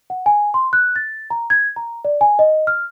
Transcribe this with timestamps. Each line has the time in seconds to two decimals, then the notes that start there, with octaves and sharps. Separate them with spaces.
0.10 F#5
0.26 G#5
0.54 C6
0.73 F#6
0.96 A6
1.30 A#5
1.50 G#6
1.76 A#5
2.05 D5
2.21 G#5
2.39 D#5
2.67 F6